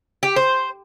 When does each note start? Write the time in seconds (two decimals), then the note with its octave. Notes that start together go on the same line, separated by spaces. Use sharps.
0.23 G4
0.36 C5